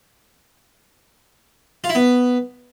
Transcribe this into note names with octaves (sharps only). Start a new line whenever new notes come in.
F4
E4
B3